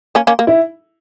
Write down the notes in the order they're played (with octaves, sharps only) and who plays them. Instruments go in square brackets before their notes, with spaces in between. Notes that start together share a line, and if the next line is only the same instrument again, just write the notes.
[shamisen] A#3 C#4
A#3 C#4
A#3
[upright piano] E4